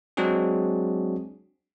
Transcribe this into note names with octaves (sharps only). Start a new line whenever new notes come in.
F#3 G#3 C4 D4 F#4 G#4